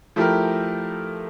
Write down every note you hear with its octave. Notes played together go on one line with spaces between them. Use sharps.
F3 A3 E4 G4 A#4